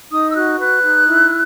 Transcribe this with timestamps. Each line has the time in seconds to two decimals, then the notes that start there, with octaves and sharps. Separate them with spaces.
0.11 D#4 D#6
0.28 E6
0.35 F#4 F#6
0.59 B4 F#6
0.83 D#4
1.07 E4